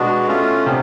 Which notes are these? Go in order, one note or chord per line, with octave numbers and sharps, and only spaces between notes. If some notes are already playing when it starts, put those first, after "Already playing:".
Already playing: B2 G#3 B3 D4 F#4
A3 C#4 F4
C3 B3 D4